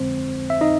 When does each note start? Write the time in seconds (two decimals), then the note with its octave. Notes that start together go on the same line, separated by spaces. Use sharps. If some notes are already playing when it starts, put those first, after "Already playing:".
Already playing: F2 D3 F3 G#3 C4 C5
0.50 E5
0.61 D#4 D#5